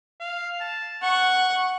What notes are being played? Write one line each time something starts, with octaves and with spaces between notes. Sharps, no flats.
F5
A5
F#5 C#6